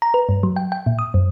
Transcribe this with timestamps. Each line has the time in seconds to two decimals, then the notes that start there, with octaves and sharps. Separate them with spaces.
0.02 A#5
0.14 B4
0.29 G2
0.43 F#3
0.56 G5
0.72 G5
0.86 A#2
0.99 D#6
1.14 F#2